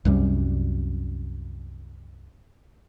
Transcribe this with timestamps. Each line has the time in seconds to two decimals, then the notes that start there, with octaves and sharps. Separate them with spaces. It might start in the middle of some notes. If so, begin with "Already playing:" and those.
0.05 C2 F#2 G3